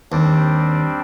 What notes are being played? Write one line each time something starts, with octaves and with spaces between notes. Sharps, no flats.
D#2 G3 C4 D4